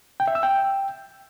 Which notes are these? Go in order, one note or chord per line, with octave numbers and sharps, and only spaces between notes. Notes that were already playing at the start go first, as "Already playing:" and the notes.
G5
E5
E6
G5